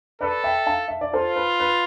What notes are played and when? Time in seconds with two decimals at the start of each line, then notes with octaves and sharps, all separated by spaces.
0.21 A4 B4 D5
0.44 E5 G5
0.66 F5 A5
0.88 E5
1.01 D5
1.13 F4 A4 C5
1.36 B4
1.60 B4